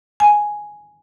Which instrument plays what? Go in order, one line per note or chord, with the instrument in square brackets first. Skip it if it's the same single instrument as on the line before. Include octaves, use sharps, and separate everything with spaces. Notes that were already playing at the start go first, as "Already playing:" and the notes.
[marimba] G#5